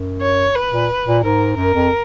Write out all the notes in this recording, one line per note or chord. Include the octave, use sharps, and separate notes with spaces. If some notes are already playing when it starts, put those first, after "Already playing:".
Already playing: F#2
C#5
B4
A#2
A#2
G#2 A#4
F#2 A#4
F2